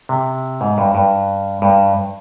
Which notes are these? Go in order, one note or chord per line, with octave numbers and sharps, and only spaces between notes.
C3
G#2
G2
G2
G2